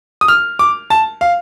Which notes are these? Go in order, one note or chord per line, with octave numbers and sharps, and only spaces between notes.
D#6
F6
D6
A5
F5